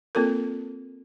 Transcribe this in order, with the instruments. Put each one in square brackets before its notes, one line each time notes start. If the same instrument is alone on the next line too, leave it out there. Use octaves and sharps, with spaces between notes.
[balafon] A#3 C4 F4 A4 A#4